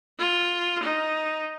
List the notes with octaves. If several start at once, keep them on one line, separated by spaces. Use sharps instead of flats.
F4
D#4